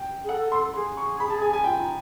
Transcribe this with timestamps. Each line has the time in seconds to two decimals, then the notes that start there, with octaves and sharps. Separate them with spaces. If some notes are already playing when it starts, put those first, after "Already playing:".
Already playing: G5
0.24 G#4
0.29 A4 F#5
0.52 C6
0.74 G#4 C6
0.97 C#6
1.20 B5
1.30 A5
1.42 G#5
1.53 G#5
1.64 F4 G5
1.80 D#4